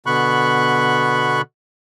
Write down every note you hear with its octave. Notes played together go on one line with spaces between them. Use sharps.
B2 D3 B3 B5 C#6 F#6